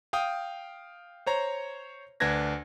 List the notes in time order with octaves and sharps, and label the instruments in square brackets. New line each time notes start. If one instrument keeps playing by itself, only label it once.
[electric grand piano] F5 G5 D#6
C5 C#5 A#5
D2 D4 B4 G#6 A#6